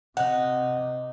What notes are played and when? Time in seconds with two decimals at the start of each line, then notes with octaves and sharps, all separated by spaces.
0.17 C3 D#4 F#5 F#6